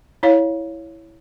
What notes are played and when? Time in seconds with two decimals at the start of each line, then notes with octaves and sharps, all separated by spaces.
0.23 E4 C#5 F5